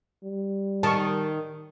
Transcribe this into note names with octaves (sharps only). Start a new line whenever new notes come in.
G3
D#3 A5 C#6